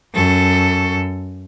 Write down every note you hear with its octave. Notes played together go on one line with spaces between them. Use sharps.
F#2 A4